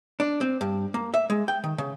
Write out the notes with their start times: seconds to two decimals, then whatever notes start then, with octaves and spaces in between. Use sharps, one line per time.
0.20 D4
0.41 C4
0.61 G2
0.94 A#3
1.14 E5
1.30 G#3
1.48 G5
1.64 D#3
1.78 C#3